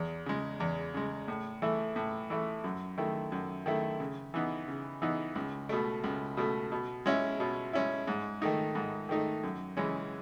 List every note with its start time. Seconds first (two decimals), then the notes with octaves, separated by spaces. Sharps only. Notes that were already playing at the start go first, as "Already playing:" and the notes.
Already playing: E2
0.26 C#3 G#3
0.60 E2
0.94 C#3 G#3
1.28 A2
1.62 E3 A3 E4
1.96 A2
2.30 E3 A3 E4
2.64 F#2
2.98 D#3 A3 E4
3.32 F#2
3.66 D#3 A3 E4
4.00 C#3
4.34 E3 B3 D#4
4.68 C#3
5.02 E3 B3 D#4
5.35 C#2
5.69 B2 A3
6.04 C#2
6.37 B2 A3
6.72 B2
7.06 G#3 C#4 E4
7.40 B2
7.73 G#3 C#4 E4
8.08 G#2
8.42 D#3 A3 D#4
8.75 G#2
9.09 D#3 A3 D#4
9.43 F#2
9.77 C#3 E3 G#3 C#4